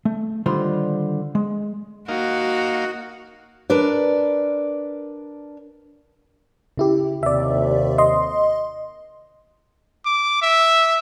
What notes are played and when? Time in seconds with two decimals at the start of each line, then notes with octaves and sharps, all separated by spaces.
0.05 A3
0.46 D3 D#3 G3 F4 C5 C6
1.35 G#3
2.08 A#3 D#4 F#4 F5
3.70 D4 A#4 B4 D5
6.77 C#3 E4 G4
7.23 D#2 C3 D5 E5
7.98 D#5 C6
10.06 D6
10.42 E5